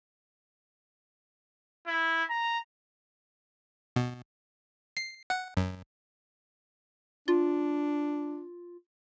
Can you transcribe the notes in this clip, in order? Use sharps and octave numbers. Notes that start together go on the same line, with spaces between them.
E4
A#5
B2
C7
F#5
F#2
D4 F4